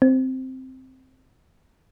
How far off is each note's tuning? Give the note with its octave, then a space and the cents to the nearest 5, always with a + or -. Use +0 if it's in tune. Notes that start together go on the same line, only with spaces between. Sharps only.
C4 -5